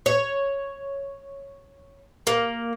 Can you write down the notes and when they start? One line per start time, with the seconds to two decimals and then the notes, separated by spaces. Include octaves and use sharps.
0.06 C#5
2.27 A#3